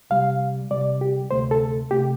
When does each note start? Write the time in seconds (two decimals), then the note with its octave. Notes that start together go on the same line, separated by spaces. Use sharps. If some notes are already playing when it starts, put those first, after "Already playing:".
0.10 C2 C3 G3 F5
0.71 C2 C3 G3 D5
1.01 G4
1.31 D2 C3 A3 C5
1.51 A4
1.91 C3 A3 G4